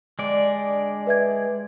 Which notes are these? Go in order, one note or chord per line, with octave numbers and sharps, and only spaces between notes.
D3 G#3 D4 G4 D5
B4 E5 G#6